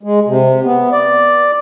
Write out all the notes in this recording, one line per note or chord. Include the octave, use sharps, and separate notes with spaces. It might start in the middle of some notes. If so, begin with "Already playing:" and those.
G#3
C3
B3
D5